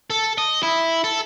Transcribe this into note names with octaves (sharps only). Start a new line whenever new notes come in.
A4
D#5
E4
A4